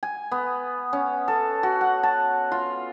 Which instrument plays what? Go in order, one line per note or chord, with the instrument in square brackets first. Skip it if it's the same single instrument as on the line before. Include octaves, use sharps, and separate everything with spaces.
[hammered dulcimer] G#5
B3
C#4
A4
F#4
F#5
A5
F4